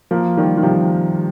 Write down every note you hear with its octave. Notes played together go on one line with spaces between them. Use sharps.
F3 A#3
D#3 G3
D#3
C3 F3